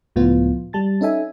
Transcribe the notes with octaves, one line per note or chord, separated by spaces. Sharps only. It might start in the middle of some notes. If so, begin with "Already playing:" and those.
C#2 A2 F3 B3 F4
G3 A5 A6
C#4 D#4 A4 E5 G#5